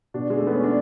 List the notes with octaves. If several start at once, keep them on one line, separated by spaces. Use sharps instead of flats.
B2 D4
G#3
A3
B3
C#4
D4